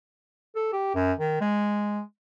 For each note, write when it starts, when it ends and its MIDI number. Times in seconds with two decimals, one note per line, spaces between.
0.56 0.71 69
0.73 0.94 67
0.95 1.13 42
1.18 1.37 51
1.41 2.01 56